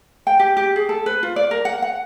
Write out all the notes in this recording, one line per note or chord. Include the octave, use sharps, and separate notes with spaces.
G5
G4
G4
G#4
A4
B4
F4
D5
A#4
F#5
F#5